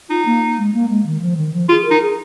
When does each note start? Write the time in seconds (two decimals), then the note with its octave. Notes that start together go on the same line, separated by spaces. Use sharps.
0.09 D#4 F4
0.26 A#3
0.58 G#3
0.74 A#3
0.90 G#3
1.06 D#3
1.22 F3
1.37 D#3
1.54 F3
1.69 F4 G#4
1.85 A#4
1.91 D#4
2.02 G#4